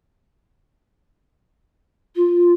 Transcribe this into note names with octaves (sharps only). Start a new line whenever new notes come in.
F4